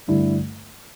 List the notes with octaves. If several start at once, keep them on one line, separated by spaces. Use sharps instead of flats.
G2 D3 A3 E4